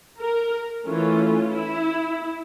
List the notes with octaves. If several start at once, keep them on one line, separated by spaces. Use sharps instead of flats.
A#4
E3 A3 C#4 F4
E4